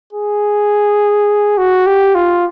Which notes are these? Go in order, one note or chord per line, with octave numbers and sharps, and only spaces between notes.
G#4
F#4
G4
F4